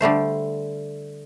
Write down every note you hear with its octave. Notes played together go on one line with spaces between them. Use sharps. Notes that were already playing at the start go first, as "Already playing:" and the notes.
D3 G3 A3 C5